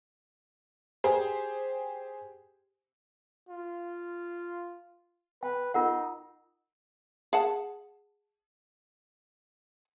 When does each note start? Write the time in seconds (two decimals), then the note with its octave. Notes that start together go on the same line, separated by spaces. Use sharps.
1.04 G4 G#4 C5
3.49 F4
5.43 B4 G5
5.74 D#4 F4 A#4 F#5
7.33 G#4 F#5 A5